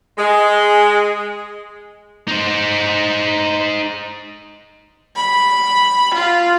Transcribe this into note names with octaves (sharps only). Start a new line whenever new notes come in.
G#3
D#4 C5
B5
F4